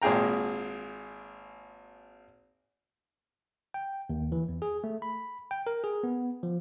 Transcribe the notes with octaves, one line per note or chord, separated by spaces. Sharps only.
G#1 A#2 G#4 G5 A#5
G5
D#2
E3
E2
G#4
A3
B5
G5
A#4
G#4
B3
F3